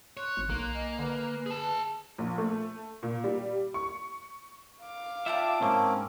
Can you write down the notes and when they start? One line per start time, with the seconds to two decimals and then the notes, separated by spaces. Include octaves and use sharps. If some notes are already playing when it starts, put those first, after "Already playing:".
0.17 C#5 C6 F#6
0.37 G#1
0.50 B1 A#3
0.73 D#5 G#5
0.99 D3 B4 G#5
1.46 G#4 A5
2.18 A#1
2.38 A3
3.03 A#2
3.24 G3
3.74 C#6
4.82 F5 D6
5.26 D4 F4 E5 G5 A5
5.61 C2 G#2 A#3 C4 C#4